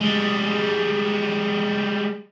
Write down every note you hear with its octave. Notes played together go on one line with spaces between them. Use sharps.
G3 G#3